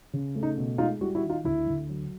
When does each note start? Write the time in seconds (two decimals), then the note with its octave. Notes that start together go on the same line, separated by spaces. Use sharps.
0.13 C#3
0.36 A3
0.43 D#4
0.58 B2
0.78 G#3 D#4 F4
1.01 G3 E4 F#4
1.15 E4 F#4
1.23 D#3
1.30 D#4 F4
1.44 D2 E4
1.67 D2
1.89 F#3